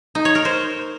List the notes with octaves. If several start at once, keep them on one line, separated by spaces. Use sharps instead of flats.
D#4
C#5
A#4
C5